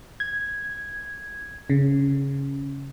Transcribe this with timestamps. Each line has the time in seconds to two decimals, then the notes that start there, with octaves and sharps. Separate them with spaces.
0.20 G#6
1.70 C#3